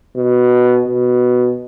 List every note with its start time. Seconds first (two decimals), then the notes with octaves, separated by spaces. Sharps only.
0.16 B2
0.87 B2